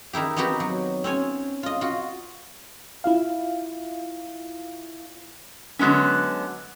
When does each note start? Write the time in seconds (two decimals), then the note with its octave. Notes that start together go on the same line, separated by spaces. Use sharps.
0.13 D#3 D#4 E4 G4
0.36 B3 C4 D#4 F#4 G4 B4
0.60 F#3
1.04 C4 C#4 C#5 G#5
1.63 F4 D#5
1.81 F4 F#4
3.04 E4 F4 F5
5.79 D3 F#3 G#3 B3 C#4